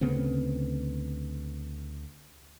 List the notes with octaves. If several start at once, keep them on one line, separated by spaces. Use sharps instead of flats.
D2 C#3 B3 C4